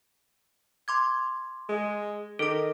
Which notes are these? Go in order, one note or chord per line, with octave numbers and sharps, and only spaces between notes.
C6 D6 G#6
G#3
D#3 A4 D6